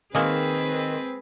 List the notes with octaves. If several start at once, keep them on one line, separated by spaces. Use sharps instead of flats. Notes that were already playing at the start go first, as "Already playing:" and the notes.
D#3 G#3 A#3 C4 F#4 G#4 B4